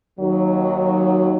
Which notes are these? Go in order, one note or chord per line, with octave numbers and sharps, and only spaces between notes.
D#2 D#3 F#3